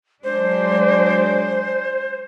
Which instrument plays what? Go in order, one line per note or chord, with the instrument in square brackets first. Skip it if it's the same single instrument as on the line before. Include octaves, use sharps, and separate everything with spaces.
[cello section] F#3 G#3 D4 [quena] C5